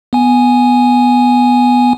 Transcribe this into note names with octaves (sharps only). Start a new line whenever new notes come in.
B3 G#5